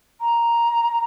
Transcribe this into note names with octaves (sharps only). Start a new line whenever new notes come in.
A#5